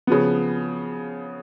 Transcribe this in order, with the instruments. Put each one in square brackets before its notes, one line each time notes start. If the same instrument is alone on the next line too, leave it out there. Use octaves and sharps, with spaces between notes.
[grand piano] C#3 F3 B3